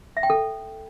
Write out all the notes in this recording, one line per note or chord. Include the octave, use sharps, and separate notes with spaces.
E5
G5
A4